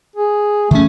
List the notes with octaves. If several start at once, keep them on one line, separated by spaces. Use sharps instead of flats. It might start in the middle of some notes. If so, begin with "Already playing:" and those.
G#4
E3 A3 C#4